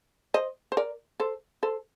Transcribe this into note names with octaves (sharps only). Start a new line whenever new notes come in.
C5 D#5
C5
A#4 D5
A4 C5
A4 C5